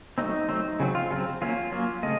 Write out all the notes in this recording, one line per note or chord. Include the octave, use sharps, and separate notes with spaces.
F#3 A3 C4 D#4
F#3 A3 C4
C#3 F#3 C4
F4
C#3 F#3 C4
F#3 A#3 C#4 F4
F#3 A#3 C#4
C#3 A3 C4 D#5